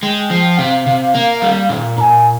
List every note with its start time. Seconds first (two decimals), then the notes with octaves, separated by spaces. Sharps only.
0.03 G#3 G5
0.30 F3
0.58 C3 F5
0.86 C3
1.15 A#3
1.42 G3
1.69 A#2
1.98 A#2 G#5 A#5